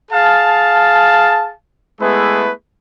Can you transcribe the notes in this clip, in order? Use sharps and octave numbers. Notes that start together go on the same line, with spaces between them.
G#4 F5 A5
G#3 A3 B3 E4 G#4 B4